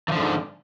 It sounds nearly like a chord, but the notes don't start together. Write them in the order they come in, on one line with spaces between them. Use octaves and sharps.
E3 F3 D3 G#2